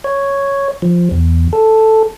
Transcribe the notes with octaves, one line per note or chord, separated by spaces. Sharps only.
C#5
F3
E2
A4